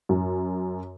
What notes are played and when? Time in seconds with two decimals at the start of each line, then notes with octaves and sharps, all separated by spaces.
0.09 F#2